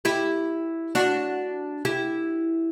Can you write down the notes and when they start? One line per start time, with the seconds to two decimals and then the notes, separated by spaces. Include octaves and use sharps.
0.05 E4 G4
0.95 D4 F#4
1.85 E4 G4